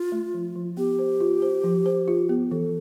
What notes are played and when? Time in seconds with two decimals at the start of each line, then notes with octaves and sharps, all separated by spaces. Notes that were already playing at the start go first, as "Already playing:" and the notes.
Already playing: F4
0.12 A3
0.34 F3
0.56 F3
0.77 B3 G4
0.99 C5
1.21 F4
1.42 C5
1.64 F3
1.86 C5
2.08 F4
2.29 B3
2.51 E3 A4